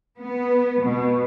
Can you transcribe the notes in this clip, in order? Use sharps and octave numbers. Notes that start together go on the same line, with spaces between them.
B3
B2